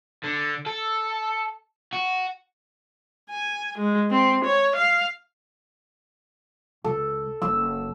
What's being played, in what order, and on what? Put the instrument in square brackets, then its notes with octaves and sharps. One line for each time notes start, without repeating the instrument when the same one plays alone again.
[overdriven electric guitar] D3
A4
F#4
[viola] G#5
G#3
C4
C#5
F5
[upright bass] C#2 [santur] A4
[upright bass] F#1 C#4 [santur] E6